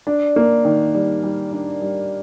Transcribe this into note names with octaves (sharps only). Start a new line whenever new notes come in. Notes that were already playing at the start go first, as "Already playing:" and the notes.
D4
A#3
D#3
G3
G3
D4
G3